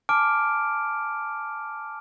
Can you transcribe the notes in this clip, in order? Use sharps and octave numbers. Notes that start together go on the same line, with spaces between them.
G#5 A5 D6 F6 D7